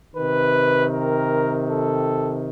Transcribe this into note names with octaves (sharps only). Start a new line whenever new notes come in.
C3 D#3 B4
A#4
A4